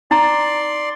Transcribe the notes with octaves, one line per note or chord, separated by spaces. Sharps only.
D#4 D5 A#5 C6